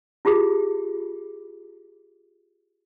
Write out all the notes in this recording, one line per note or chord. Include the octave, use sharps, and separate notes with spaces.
E4 F4 G4 G#4